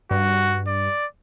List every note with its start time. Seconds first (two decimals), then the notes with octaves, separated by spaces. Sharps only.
0.11 G2 F#4
0.68 D5